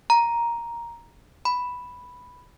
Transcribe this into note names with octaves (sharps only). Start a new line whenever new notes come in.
A#5
B5